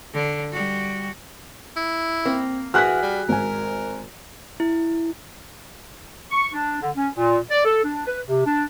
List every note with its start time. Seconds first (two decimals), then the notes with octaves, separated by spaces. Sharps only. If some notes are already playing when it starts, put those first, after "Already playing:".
0.14 D3
0.53 G3 F#4
1.77 E4
2.25 A#3 C4
2.74 E3 F#4 G#4 F6 F#6 B6
3.02 G3
3.29 G#1 A#4 G#5
4.60 E4
6.31 C#6
6.53 D4
6.82 D3
6.96 C#4
7.15 A#2
7.51 D5
7.65 A4
7.84 D4
8.07 B4
8.27 C3
8.46 D4